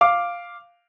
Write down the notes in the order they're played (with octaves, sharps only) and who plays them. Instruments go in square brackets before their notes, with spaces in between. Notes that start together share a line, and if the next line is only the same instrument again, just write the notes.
[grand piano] F5 D6